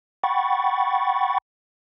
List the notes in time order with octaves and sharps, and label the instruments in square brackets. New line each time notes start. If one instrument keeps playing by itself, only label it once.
[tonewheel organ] F#5 G5 B5 C#6 A6